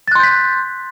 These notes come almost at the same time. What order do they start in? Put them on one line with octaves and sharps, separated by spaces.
A6 F#6 C6 G6 B6